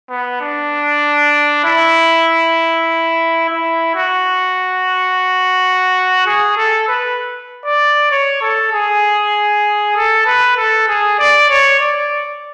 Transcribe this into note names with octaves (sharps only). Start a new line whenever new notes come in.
B3
D4
E4
E4
F#4
G#4
A4
B4
D5
C#5
A4
G#4
A4
B4
A4
G#4
D5
C#5
D5